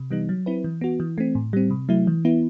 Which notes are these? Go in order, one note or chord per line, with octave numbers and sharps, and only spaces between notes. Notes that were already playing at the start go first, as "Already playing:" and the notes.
Already playing: C3
E3 G3 B3 D#4
F#3
C4 E4 B4
E3
B3 F#4
E3
A3 C4
A2
G3 C4
C3
F#3 A3 E4
E3
B3 E4